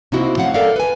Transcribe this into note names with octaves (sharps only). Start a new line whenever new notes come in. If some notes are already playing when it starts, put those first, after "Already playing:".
C3 A#3 C4 D#4 E4 F#4
A2 F#3 C4 C#4 F5 F#5
A4 A#4 D5 E5 F5
B4 G#5